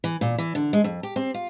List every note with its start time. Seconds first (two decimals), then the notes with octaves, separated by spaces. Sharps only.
0.04 E3
0.21 A#2
0.38 E3
0.55 D3
0.73 G#3
0.84 F2
1.03 G4
1.16 C4
1.34 F4